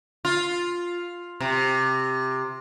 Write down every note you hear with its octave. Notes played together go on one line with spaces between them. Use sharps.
F4
C3